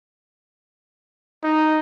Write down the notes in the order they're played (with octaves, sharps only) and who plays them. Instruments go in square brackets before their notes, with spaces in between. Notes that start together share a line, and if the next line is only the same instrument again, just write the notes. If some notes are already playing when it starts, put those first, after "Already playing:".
[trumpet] D#4